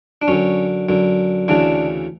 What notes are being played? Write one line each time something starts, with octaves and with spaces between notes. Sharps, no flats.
D4
F#2 D3 C#4
F#2 D3
D2 C#3 E3 D4